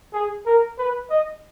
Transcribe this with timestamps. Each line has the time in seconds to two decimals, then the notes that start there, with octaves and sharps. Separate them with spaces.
0.13 G#4
0.46 A#4
0.78 B4
1.10 D#5